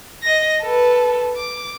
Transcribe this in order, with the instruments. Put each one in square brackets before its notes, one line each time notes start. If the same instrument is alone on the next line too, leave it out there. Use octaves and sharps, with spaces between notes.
[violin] D#5 A#6
A4 B4
D6